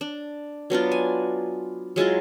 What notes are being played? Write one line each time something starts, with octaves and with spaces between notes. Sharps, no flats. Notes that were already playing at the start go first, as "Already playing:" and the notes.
D4
F#3 B3 D4 F4
G#5
F#3 G#3 E4 F4